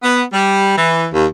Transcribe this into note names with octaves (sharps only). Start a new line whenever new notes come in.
B3
G3
E3
D#2